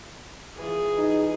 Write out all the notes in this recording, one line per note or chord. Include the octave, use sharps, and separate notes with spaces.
E3 F4 G#4
D#4